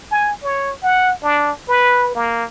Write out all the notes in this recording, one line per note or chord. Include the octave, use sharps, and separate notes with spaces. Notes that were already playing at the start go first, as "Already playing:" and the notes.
G#5
C#5
F#5
D4
B4
A#3